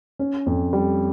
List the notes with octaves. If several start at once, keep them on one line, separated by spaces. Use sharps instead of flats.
C#4
F2
G3